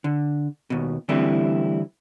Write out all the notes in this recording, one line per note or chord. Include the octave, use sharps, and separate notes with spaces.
D3
D#2 B2
D3 E3 G3 A3 C4 E4